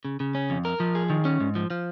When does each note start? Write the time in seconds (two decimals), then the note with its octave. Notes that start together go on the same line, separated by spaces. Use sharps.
0.05 C#3
0.20 C#3
0.35 C#4
0.50 F2
0.65 A#4
0.80 F3
0.95 G#4
1.10 D#3
1.25 C#4
1.40 G#2
1.55 F3
1.70 F3